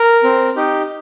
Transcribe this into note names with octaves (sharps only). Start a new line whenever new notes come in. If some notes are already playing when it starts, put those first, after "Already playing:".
Already playing: A#4
C4
D#4 G4